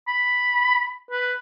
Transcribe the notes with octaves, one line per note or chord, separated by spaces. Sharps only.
B5
B4